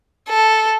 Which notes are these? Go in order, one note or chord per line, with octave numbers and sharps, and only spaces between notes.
A4